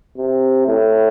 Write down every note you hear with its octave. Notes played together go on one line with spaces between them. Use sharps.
C3
A2